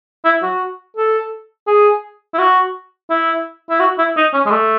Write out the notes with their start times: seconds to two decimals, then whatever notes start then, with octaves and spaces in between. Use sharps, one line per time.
0.25 E4
0.43 F#4
0.97 A4
1.67 G#4
2.34 E4
2.39 F#4
3.10 E4
3.70 E4
3.80 F#4
3.98 E4
4.17 D#4
4.33 C#4
4.46 G#3
4.51 A3